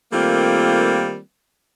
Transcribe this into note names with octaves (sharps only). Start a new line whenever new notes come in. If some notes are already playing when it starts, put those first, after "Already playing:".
D#3 G3 A3 A#3 C4 F4